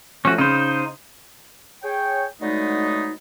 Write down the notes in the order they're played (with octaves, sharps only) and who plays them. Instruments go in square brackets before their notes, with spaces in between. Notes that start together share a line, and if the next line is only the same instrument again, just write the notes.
[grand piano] F3 A3 [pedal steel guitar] C#4 F#4
[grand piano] C#3 [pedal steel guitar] D#4 C5
[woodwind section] G#4 C#5 G5
D3 F#3 G#3 A3 B3 D#4